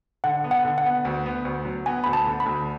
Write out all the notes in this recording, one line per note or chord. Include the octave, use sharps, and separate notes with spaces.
D3 F#5
B3
F#5
D3
F#5
B3
D2
B3
D2
F#3
B3 G#5
D2 B5
A5
D3
B5
D2